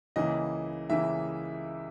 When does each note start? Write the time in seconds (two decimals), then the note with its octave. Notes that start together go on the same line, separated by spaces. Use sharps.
0.16 C#2 C#3 E3 A#3 E4 D#5
0.89 C#2 C#3 E3 A#3 E4 E5